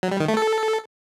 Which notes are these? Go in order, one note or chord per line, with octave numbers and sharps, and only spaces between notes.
F#3
G3
D#3
A3
A4